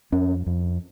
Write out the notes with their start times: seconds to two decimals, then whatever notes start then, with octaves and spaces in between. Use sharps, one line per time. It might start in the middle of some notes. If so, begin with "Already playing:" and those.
0.12 F2 C#4
0.47 F2